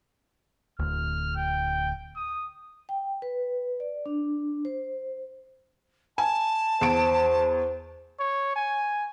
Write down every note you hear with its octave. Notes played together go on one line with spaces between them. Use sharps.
D1 D2 F6
G5
D#6
G5
B4
D5
D4
C5
G#5 A5
E2 C5 D7
C#5
G#5